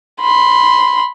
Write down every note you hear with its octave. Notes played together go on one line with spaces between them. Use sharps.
B5 C6